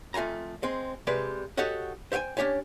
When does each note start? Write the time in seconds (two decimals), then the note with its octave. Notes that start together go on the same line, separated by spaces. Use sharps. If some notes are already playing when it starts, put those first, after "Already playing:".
0.14 F2 A3 F4 G#5 A#5
0.63 G#3 C4
1.07 C3 G3 G#3 B4 D5
1.57 F#4 G4 A4 C#5 D#5 F#5
2.12 C5 E5 F5 G5 G#5
2.37 C#4 D4 G4 C#5 G#5